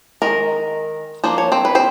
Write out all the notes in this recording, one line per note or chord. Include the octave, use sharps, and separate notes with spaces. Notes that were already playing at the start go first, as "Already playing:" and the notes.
D#3 G#3 A#4
F3 A#3 D4 C5
C#5
C4 C5
B4
C4 C5